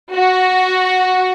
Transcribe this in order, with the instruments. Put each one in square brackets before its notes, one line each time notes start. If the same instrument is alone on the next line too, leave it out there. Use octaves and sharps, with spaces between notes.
[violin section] F#4